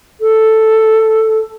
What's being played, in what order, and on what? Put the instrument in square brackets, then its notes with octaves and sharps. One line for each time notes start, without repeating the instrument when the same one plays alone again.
[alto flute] A4